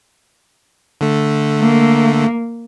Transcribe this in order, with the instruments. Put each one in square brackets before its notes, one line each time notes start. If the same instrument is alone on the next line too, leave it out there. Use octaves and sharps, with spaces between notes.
[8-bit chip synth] D3 A3
[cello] A#3